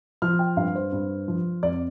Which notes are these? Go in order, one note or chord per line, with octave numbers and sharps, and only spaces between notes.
F3 F6
G5
G2 F5
C5
G2
F3
F2 D5